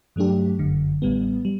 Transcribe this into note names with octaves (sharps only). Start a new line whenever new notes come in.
G2 F#3 A3 D4 G4
G1 F#2 D3
A1 A2 G3 B3
G3